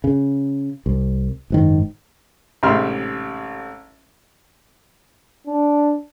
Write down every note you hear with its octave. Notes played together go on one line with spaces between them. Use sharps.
C#3
C2
F#1 G#2 D#3
A1 G#2 C3 E5 C6 F6
D4